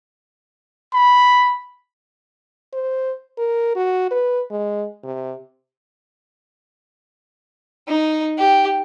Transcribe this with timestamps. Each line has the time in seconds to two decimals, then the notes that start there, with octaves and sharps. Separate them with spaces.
0.94 B5
2.73 C5
3.38 A#4
3.75 F#4
4.11 B4
4.50 G#3
5.04 C3
7.88 D#4
8.38 G4